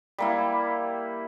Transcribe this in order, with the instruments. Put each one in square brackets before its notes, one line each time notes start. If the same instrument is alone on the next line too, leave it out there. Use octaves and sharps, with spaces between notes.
[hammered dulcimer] G3 A#3 E4